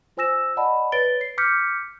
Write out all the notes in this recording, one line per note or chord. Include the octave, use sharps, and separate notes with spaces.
F4 C5 G#5 E6 A#6 E7
D5 D#5 F#5 A5 B5
B4 C#5 A6 D7 G7
C7
D6 F6 G6 B6 C#7